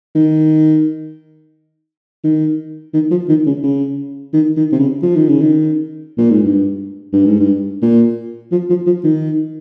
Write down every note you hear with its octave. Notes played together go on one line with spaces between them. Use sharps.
D#3
D#3
D#3
F3
D#3
C#3
C#3
D#3
D#3
C3
C#3
F3
D#3
C#3
D#3
A#2
G#2
G2
G2
G#2
G2
A#2
F3
F3
F3
D#3